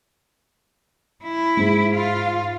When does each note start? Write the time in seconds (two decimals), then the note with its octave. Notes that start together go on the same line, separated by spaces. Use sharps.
1.24 E4
1.57 G#2 G#3
1.93 F4 F5